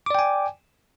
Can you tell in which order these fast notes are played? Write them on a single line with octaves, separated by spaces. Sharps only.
D6 D5 G5 G#5